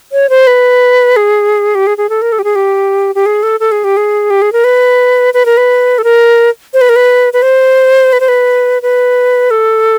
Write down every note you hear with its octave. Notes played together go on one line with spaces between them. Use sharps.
C#5
C5
B4
G#4
G4
G#4
G#4
A4
A#4
A4
G4
G#4
G4
G4
G#4
A4
A4
G#4
G4
G#4
G4
G#4
A#4
B4
B4
A#4
B4
A4
A#4
C5
B4
A#4
B4
B4
C5
B4
C5
B4
B4
A4